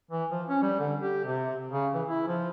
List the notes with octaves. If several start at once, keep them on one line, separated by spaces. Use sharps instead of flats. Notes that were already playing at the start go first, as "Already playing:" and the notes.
E3
F3
C#4
G3
D3
G4
C3
C#3
E3
E4
F3